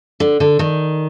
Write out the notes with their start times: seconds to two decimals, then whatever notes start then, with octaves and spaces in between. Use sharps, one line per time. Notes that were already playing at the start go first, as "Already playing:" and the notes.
0.20 D3
0.40 D3
0.59 D#3